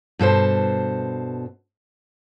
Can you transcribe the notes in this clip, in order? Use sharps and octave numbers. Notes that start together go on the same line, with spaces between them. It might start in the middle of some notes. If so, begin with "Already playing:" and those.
G2 B2 A4 C5